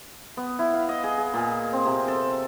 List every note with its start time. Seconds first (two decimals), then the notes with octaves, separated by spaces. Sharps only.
0.37 B3
0.59 E4
0.74 F5
0.89 D#5
1.04 G#4
1.18 G#4
1.34 A#2
1.73 C4
1.86 C3
2.08 A4